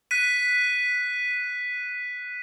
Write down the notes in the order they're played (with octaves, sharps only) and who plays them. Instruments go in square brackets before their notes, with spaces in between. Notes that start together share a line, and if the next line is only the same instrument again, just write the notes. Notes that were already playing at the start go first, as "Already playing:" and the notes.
[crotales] F#6 B6 D#7